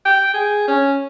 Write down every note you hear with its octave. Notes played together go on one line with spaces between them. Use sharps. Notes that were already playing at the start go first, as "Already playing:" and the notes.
G5
G#4
C#4